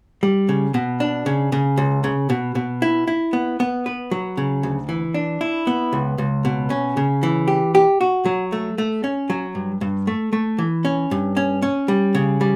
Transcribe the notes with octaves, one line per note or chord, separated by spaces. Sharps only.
G3
C#3
B2
D4
C#3
C#3
C#2
C#3
B2
B2
E4
E4
B3
B3
B4
F#3
C#3
D2
E3
D4
E4
B3
C#2
C#2
B2
C#4
C#3
E3
G4
G4
F#4
F#3
A3
A3
C#4
F#3
G2
G2
A3
A3
E3
C#4
G2
C#4
C#4
G3
C#3
G3